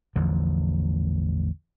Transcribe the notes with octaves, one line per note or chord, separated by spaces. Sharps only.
A1 E2 D3 F3